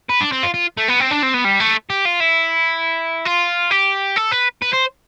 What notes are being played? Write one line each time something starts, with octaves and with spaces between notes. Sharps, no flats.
B4
D4
C4
F4
F4
A3
B3
C4
D4
C4
B3
G3
A3
G4
F4
E4
F4
G4
A4
B4
B4
C5